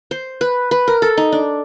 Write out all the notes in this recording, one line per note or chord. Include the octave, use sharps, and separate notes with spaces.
C5
B4
B4
A#4
A4
D#4
D4